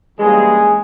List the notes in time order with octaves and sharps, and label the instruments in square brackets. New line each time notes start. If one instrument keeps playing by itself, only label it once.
[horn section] G2 E3 G3 G#3 A#3 C#4 G#4